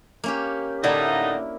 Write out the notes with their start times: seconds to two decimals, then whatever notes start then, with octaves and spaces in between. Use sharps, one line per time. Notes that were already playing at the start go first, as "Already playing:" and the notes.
0.24 A#3 C#4 G4
0.84 A2 D3 A#3 D#4 E4 E5